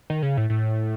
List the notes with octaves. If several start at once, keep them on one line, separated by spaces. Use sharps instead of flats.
D#3
C#3
A2
A2